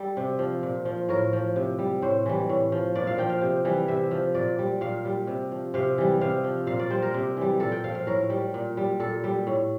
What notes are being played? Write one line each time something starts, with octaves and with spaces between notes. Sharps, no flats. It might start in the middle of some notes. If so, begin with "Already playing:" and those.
Already playing: G3 A4
C3
F3
A#2
F3
A2 A#4
F3
C3
G3
A2 C5
E3 G3
A2
F3
A#2 D5
F5
F3 G5
F5
C3
E3 G3
C3 E5
F3
A#2 D5
G3
A#2 F5
G3
C3
F3
C3 F5
E3 G3
C3 F5
F3
A#2 F5
D5
G3 C5
A#4
C3
E3 G3
A#2 A4
G5
F3 F5
F5
A2 A#4
G3
A#2
G3
A#2 A4
G3
A2